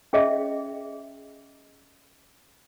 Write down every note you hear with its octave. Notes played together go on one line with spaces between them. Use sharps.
C#4 G#4 D#5 E5